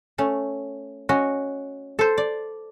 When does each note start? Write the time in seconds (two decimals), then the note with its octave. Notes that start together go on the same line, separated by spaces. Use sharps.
0.18 A3 C#4
1.09 C#4 F#4 D#5
1.99 A4 C5
2.18 D5